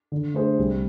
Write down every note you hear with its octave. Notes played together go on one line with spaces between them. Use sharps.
D3
A3 D4 G#4 C5
C2